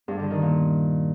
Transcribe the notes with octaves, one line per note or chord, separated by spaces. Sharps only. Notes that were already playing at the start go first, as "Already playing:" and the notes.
G2
D3
D#3
A#2